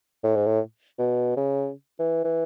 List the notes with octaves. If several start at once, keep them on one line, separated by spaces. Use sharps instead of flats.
A2
G#2
A2
B2
C#3
E3
E3